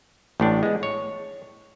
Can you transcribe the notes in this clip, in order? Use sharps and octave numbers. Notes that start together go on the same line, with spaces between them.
A1 A2 D4
G#3 B3
C#5